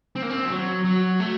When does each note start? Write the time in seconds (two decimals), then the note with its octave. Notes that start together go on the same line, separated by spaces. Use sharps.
0.16 C4
0.22 A#3
0.30 C4
0.45 F3
0.49 F#3
0.85 F#3
1.20 A3